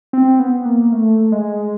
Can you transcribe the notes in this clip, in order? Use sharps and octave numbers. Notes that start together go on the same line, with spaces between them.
C4
B3
A#3
A3
G#3